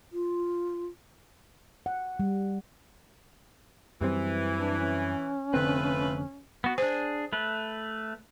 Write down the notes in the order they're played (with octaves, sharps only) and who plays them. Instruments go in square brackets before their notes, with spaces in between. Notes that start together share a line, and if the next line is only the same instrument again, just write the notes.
[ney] F4
[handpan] F#5
G3
[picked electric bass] F#2 G3 C4 [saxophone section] E3
[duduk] D4
C#4
[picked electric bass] F1 D3 C4 [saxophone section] A3 F4 B4
[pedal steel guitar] B3 F#4
[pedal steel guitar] D4 G#4 [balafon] C5
[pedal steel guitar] A3 B4